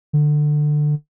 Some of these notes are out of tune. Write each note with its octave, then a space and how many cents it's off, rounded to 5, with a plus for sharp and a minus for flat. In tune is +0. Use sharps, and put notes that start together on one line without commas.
D3 +20